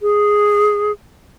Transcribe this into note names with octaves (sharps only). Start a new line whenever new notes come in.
G#4